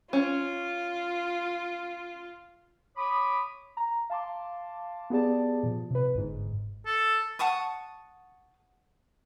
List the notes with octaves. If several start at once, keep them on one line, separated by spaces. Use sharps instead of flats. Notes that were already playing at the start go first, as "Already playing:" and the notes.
C#4 F4
C#5 B5 D6 D#6
A#5
F5 A5 C6 D6
B3 G4 G#4 D5 A5
A#2 F3
C3 B4
G1 G#2
A4
F#5 A5 C#6 D#6